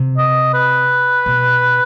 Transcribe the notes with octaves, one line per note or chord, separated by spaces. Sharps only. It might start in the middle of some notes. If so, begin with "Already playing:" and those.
Already playing: C3
D#5
B4
B2